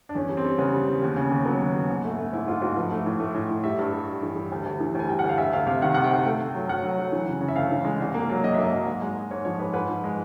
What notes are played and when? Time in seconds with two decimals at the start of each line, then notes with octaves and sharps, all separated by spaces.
0.09 D4
0.15 E2 C#4
0.29 G3
0.37 C4
0.45 G3
0.58 C#3 B3
0.74 G3
0.87 E2
1.02 D#2
1.16 C#3
1.31 D#2
1.45 F#3 B3
1.61 D#2
1.74 D#2
1.89 G#2
2.04 A3
2.19 A3
2.33 G#2 E4
2.48 G#2 F4
2.62 G#2 F#4
2.76 F3 B4
2.91 A3
3.06 A2
3.20 A3
3.34 A2
3.50 A2
3.64 G3 E5
3.79 G2
3.92 G3
4.07 G3
4.22 E3
4.36 G3
4.52 D2
4.66 D2
4.80 E3
4.95 D2 G#5
5.09 G3 G5
5.19 F#5
5.24 D2
5.29 F5
5.38 D2 E5
5.53 D2 F5
5.67 C3 F5
5.82 D#3 F#5
5.94 C3 F#5
6.04 G5
6.11 D2
6.25 A3 G5
6.40 A3
6.54 F#3
6.69 F#3 F#5
6.83 F#3
6.99 F#3
7.12 E3
7.27 C#3
7.41 C#3
7.48 E5
7.56 D2 F5
7.71 E3
7.85 G#3
8.00 C2
8.14 A#3
8.29 F#3
8.44 A#3 D#5
8.54 A#3 E5
8.65 D#5
8.72 F#3
8.86 G#2
9.02 G#3
9.16 G#3
9.31 G#2 C#5
9.45 F3 C#5
9.59 G#2 B4
9.74 G#2 B4
9.89 F3
10.04 G#3